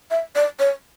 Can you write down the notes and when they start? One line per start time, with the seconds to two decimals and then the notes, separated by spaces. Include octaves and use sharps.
0.11 E5
0.36 D5
0.60 C#5